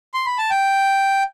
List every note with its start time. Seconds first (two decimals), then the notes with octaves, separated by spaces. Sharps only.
0.14 C6
0.26 B5
0.38 A5
0.50 G5